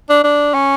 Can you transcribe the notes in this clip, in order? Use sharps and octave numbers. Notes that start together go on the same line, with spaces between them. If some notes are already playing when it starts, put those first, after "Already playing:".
D4
D4
C#4